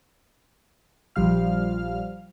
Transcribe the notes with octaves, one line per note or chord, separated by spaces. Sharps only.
A#1 F3 G3 F5 F6